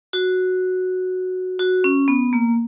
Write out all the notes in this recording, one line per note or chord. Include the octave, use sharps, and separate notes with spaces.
F#4
F#4
C#4
B3
A#3